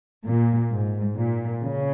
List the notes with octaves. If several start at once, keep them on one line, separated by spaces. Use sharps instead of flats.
A#2
G#2
A#2
C#3